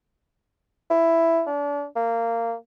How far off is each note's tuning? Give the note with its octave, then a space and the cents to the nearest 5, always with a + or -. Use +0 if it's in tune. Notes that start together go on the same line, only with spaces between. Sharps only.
E4 +5
D4 -35
A#3 -15